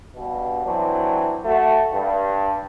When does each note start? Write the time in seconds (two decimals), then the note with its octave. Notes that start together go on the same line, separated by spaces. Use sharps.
0.16 G2 B2
0.64 E3 F#3 C4 D4
1.45 A3 F#4
1.91 G2